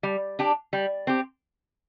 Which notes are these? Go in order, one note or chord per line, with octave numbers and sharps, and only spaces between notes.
G3
D4 G4
G3
C4 G4